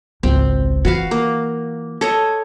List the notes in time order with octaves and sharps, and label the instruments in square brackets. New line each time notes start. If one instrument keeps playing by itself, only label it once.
[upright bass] G#1 C#2 [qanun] C4
[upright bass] E3 [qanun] F#4 B4 F5
[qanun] A#3
A4 C#5 D#5